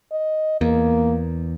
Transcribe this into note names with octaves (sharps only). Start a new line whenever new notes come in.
D#5
E2 A#3